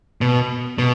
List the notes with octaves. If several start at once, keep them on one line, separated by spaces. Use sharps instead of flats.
B2
B2